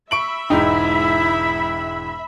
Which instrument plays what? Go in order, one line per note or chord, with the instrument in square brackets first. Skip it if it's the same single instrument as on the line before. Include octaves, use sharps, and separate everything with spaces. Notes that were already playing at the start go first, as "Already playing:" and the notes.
[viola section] E5 B5 [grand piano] C#6 D7 F#7
[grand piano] E1 G#2 G5 [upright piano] D#4 [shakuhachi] E4